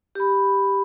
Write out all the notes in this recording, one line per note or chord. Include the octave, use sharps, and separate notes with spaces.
G4 B5